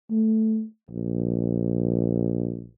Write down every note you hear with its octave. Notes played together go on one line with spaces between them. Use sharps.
A3
A#1